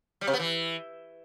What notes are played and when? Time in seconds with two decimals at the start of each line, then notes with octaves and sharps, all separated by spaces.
0.21 G3
0.27 C3
0.33 B3
0.39 E3